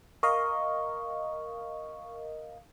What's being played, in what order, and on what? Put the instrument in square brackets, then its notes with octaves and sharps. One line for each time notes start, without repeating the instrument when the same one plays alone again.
[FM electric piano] A#4 D#5 F5 [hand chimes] C#6